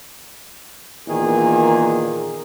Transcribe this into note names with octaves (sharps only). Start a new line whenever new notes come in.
E2 A#2 D#3 G#4